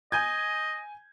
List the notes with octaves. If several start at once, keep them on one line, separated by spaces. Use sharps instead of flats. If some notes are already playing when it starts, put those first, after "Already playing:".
D#5 G#5 G6 G#6